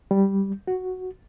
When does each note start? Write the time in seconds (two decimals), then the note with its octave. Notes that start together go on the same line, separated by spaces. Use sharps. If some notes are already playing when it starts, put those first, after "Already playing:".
0.11 G3
0.68 F#4